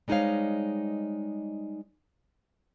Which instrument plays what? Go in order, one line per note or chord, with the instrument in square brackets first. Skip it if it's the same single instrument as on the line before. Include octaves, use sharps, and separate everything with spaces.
[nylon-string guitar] G3 G#3 D#4 C5 C#5 F5